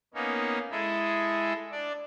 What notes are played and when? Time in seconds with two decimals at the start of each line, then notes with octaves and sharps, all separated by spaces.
0.14 A#3 B3 C#4 D#4
0.71 G#3 E4 G#4 A4
1.71 D4 D5